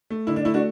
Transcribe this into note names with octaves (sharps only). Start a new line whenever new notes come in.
A3
D3 E4
D4
A3 E4
D4 F#4